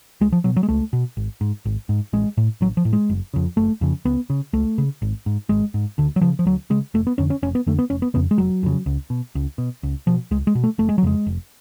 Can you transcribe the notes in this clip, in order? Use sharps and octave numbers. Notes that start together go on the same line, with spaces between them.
C#2 G#3
F3
B2 F#3
F#3
G#3
C#2 A3
B2
G#1
G#2
G#1
G#2
A1 G#3
A2
A1 F#3
F3
A2
G#3
F#1
F2 C#3
F#1 A3
F2 C#3
C#2 B3
C#3
C#2 A3
C#3
G#1
G#2
G#1 G#3
G#2
D2 D3
F#3
C#3 F3
F3
D2 F#3
C#3 G#3
F1 A3
B3
F2 D3 C#4
C#4
F1 C#4
B3
F2 D3 A3
B3
F1 C#4
B3
F2 C#3 B3
G#3
F1 F#3
F2 C#3
C#2
B2
C#2
B2
C#2
B2 F3
C#2 G#3
G#3
B2
A3
F1 A3
G#3
F#3
F2 C#3 G#3
F1